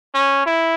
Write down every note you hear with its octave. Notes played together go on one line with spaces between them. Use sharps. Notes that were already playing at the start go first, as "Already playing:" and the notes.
C#4
E4